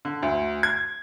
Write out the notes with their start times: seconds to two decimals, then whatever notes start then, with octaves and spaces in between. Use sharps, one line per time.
0.05 D3
0.23 D2
0.63 G#6